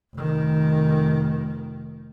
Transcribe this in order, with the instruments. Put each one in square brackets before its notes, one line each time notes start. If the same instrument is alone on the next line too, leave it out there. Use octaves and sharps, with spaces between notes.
[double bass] F1 D#3